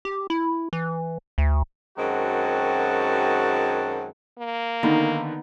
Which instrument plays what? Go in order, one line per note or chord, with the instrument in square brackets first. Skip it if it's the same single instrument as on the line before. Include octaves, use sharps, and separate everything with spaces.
[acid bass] G4
E4
E3
D2
[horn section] F#2 D#3 G#3 C4 F#4 A5
[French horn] A#3
[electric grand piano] D3 D#3 [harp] B3 D#4